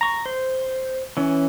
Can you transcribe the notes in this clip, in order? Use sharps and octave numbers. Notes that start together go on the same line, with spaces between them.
A#5 C#6
C5
E3 C#4